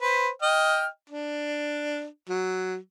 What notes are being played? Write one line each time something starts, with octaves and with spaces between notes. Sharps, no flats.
B4 C5
D#5 G5 F6
D4
F#3